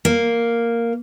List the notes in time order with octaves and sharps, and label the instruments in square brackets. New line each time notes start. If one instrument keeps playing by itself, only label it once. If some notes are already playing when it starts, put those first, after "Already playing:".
[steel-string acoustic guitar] A#3